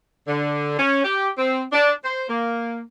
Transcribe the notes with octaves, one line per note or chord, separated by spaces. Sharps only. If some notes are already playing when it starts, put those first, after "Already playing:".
D3
C#4
G4
C4
D4
C5
A#3